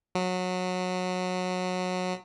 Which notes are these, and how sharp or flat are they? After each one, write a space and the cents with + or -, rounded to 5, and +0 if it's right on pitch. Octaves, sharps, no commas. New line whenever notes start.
F#3 -20